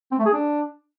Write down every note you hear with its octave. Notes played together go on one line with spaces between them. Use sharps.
C4
A3
G#4
D4